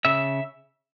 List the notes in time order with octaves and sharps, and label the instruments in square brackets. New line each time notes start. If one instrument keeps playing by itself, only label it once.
[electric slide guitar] C#3 E5